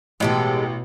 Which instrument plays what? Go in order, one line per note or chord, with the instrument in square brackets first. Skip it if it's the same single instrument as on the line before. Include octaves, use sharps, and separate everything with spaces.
[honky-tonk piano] A1 [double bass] B2 [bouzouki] G#3 G4 A4